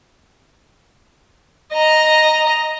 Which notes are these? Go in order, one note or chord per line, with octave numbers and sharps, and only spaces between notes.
D#5 A#5